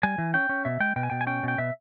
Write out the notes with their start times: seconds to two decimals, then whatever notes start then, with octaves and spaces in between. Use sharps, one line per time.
0.03 G3 G#5
0.18 E3
0.34 C#4 G5
0.49 C#4
0.65 B2 E5
0.80 G#3 G5
0.96 B2 G5
1.03 G#5
1.10 B2 G5
1.21 G#5
1.27 C#4 G5
1.43 B2 G5
1.58 B2 E5